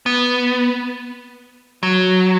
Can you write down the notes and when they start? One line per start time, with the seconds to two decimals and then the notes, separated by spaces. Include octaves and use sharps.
0.06 B3
1.83 F#3